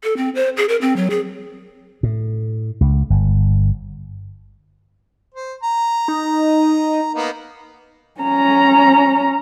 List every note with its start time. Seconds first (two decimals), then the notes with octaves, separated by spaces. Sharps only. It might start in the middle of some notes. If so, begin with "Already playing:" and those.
0.03 A4
0.17 C4
0.35 C5
0.57 G#4
0.69 A#4
0.81 C4
0.96 F#3
1.10 G#4
2.03 A2
2.81 C#2
3.10 G1
5.35 C5
5.63 A#5
6.08 D#4
7.15 A#3 B3 D#4
8.21 C#4 A#5